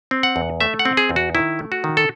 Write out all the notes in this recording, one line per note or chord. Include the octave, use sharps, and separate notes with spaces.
C4
F#5
E2
A3 E5
F#5
C4
G#4
E2
F#4
D#3 E4
A3
F#4
D#3
A4